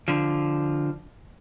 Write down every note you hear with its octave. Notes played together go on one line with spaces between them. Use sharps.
D3 F3